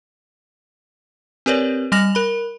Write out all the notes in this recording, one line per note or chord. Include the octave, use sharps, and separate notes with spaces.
C4 G4 A#4 B4 C#5 D5
G3 G#5 F6 A#6 F7 F#7
A#4 B5